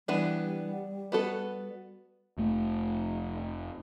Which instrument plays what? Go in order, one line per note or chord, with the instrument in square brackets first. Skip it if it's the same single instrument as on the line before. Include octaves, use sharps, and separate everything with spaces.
[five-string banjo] E3 B3 D4 [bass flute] G3
[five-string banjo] B3 F#4 A4
[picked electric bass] F1 A3